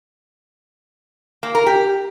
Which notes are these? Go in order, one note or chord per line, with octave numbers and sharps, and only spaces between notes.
A#3
A#4
G4